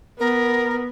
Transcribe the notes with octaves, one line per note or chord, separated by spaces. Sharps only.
B3 A#4